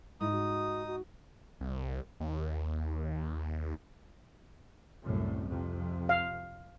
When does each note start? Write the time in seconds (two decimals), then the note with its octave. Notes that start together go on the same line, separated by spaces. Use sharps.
0.21 G#2 D#4 E4 D#6
0.32 F#4
0.87 F#4
1.61 C2
2.20 D#2
5.04 C2 F#2 A2
5.48 F2 C3
6.09 F5